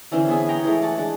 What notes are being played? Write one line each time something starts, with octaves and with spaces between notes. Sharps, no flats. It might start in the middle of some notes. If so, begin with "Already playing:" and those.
D3 E3 C4 C#4
B3 G#4 E5 G#5
C#5 G5 A#5
E3 G#3 A3
F#5 A5
G#3 D4